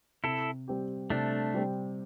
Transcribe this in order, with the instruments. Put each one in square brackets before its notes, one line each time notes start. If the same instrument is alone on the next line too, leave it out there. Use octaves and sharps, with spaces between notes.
[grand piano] C3 [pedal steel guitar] E4 A4
[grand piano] G3 C4 G4
[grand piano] C3 [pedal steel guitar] A3 D4
[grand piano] G3 C4 G4